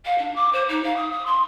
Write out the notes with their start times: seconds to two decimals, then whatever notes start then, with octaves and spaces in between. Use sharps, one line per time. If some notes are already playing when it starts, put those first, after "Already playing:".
0.05 F5
0.18 D4
0.35 D6
0.52 C5
0.68 D#4
0.83 F5
0.96 D#6
1.11 D#6
1.26 C6